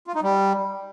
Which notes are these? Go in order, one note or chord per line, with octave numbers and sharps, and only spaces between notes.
F4
D#4
G3